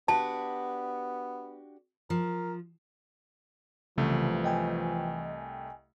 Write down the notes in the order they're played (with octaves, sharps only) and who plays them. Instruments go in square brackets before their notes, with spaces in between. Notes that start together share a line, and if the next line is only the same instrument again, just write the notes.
[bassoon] B3 [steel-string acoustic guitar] D4 F#4 G4 [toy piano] A5
[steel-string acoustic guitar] F3 [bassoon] A#4
[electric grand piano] C2 A3 [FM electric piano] C#3 [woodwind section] E3 [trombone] F3
[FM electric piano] D#5 G5 G#5